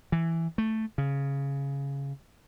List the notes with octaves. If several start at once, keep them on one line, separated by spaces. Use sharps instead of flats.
E3
A3
C#3